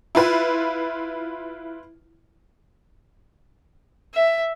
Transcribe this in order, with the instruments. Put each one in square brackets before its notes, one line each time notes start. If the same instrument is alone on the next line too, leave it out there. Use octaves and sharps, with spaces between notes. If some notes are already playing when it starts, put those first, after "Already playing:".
[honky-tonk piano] E4 F4 B4
[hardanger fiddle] E5